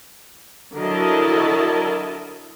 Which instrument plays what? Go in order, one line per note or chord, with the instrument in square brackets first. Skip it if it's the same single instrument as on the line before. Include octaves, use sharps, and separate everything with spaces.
[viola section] D3 F#3 E4 A#4 D#5 A5